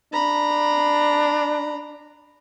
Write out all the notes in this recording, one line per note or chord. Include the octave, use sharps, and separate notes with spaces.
D4 A#5 B5